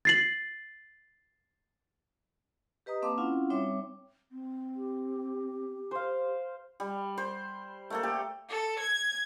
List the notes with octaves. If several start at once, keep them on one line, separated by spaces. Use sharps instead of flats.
A6 C7 F#7
G4 B4 D#5 A#5 D#6
A#3 C4 F5 A5 D6
C4 C#4 E4 F4 F5 F#5
G3 C4 D#4 C#5 E5 D6
C4
G4
C5 F5
G3
C5
A3 A#3 A4
G4
A4
G#6